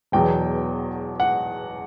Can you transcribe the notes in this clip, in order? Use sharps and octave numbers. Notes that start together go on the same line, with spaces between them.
E1 E2 B2 F#3 G5
F#5